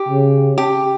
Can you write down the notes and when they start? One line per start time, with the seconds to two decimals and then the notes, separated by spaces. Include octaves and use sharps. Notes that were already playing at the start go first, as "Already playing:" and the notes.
Already playing: G4
0.09 C#3
0.58 G4